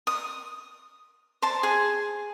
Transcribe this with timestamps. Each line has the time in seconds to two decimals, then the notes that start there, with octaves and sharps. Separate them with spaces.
0.07 D#6
1.42 C5 A5
1.63 G#4